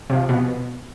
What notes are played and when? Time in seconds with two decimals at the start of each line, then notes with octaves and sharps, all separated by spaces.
0.10 C3 F3
0.29 B2